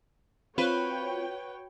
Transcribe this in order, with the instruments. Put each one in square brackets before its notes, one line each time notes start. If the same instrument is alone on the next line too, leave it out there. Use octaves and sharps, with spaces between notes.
[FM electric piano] C4 F4 [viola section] F#4 C#5 G5 [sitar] B4